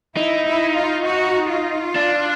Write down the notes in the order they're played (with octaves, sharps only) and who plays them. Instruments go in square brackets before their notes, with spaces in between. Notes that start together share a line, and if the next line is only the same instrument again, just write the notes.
[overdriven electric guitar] D#4 [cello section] E4
[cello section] E4
F4
F#4
F4
[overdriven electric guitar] D4